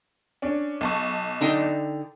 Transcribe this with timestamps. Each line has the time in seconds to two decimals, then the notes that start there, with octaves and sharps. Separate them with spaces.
0.42 C#4 D4
0.81 B1 A5 C#6
1.41 D3 D#4 G5